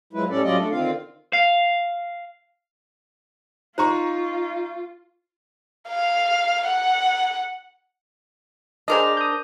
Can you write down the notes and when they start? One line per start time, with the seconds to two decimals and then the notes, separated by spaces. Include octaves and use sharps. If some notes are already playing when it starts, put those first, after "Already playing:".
0.13 F3 F#3 G#3 E4 B4
0.29 A2 G3 C#4 A4 D5
0.43 F#3 G3 C#4 F4 D5 D#5
0.57 A3 D4 A4
0.71 D3 D#3 C4 F4 F5
1.33 F5
3.78 D#4 F4 C5 A#5 C6 C#6
5.88 F5
6.66 F#5
8.88 D4 G#4 A#4 C5 D#5
9.17 D#6 G6